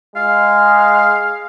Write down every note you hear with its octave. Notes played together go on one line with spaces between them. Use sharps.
G#3 F5